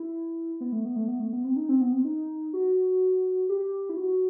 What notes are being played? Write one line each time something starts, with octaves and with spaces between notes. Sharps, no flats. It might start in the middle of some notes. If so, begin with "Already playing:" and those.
Already playing: E4
B3
A3
B3
A3
B3
A3
B3
C4
D#4
C4
B3
C4
D#4
F#4
G4
E4
F#4